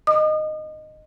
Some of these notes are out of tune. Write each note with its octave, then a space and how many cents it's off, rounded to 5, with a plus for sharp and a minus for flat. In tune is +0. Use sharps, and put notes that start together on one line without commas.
D#5 -10 D#6 -40